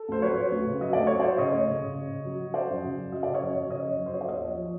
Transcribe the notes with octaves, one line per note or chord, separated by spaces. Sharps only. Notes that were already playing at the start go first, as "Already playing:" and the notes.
Already playing: A4
D2 C5
F#3 B4 C#5
F#3
D2
C#3
F#3 D#5
D2 D5
F#3 C#5
F#3 C5 D5
C#3 C#5 D#5
D2
C#3
C#3
C#3
C#3
F#3
F#3
F#3 C5 D5
F#2
C#3
F#2
F#3 D#5
C#3 D5
C#5 D#5
F#2
F#3
C#3 C#5 D#5
F#2
F#2
C5
F#3 C#5
D5
D#2 C#5 D#5
F3
F3